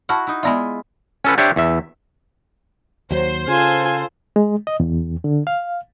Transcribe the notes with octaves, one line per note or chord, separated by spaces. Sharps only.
E4 F#4 F#5 A5 C#6 F6
D#4 E4
G#3 B3 E4 F4 D5 E5
C#4 A4 B4
D4 G4 C5 C#5 E5
E2 E5
D#2 F#3 C5
C#3 F4 A4 F5 G#5 C6
G#3
D#5
E2
D3
F5